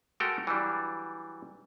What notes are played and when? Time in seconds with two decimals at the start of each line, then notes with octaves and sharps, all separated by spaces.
0.20 G#3 A3 F#4 A4 A#4 G5
0.47 E3 F#3 G3 D4